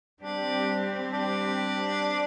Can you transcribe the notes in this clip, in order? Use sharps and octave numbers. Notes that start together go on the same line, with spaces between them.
G3 C4 D4 G4
D4